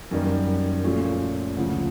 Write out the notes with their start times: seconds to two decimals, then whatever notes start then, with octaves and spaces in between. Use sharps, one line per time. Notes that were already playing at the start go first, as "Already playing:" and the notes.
0.11 F#2 D#3 G3 A#3
0.84 A#2 F3 A3 C#4 F4
1.56 D2 C#3 F3